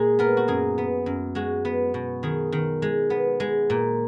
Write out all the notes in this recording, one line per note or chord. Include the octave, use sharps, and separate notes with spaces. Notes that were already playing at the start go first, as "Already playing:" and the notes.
Already playing: A#2 G#3 G#4
B3 A#4
F#4
F#2 G#4
B3
F#2
G#3 F#4
B3
B2
D#3 G#4
D#3
G#3
B3
G#3
A#2